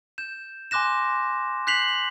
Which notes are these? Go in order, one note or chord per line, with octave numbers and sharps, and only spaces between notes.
G6 E7
G#5 C6 D6 F#6 A#6 E7
F#6 G6 B6 C7 F7 F#7